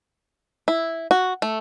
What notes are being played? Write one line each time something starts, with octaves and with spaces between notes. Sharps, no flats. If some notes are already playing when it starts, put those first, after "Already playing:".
E4
F#4
A3